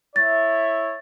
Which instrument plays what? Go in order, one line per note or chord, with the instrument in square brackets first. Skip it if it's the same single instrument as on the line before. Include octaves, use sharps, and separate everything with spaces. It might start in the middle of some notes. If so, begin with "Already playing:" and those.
[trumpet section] E4 C#5 E5 [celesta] A6